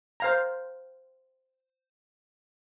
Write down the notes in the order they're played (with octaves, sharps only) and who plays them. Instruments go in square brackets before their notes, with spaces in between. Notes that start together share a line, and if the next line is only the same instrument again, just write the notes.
[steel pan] C5 F5 A#5